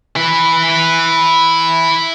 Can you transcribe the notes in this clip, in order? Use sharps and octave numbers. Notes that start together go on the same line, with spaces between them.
E4 B4